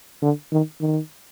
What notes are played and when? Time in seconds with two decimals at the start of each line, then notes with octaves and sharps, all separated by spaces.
0.22 D3
0.52 D#3
0.81 D#3